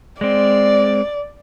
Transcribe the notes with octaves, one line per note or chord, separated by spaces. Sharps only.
G#3 C4 D5